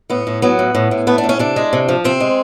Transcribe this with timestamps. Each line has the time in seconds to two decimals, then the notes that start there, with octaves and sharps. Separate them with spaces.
0.10 A2 B3
0.27 A2
0.42 F#3 B3
0.59 A2
0.75 A2
0.91 A2
1.07 A3 B3
1.18 D4
1.24 A2
1.29 C#4
1.39 C3 D4
1.56 G#3
1.73 C3
1.89 F3
2.04 C3 C4
2.20 G#3